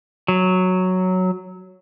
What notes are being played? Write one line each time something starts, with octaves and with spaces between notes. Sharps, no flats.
F#3